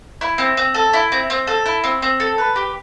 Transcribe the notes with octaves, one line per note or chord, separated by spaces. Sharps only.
E4
C4
C4
A4
E4
C4
C4
A4
E4
C4
C4
A4
B4
G4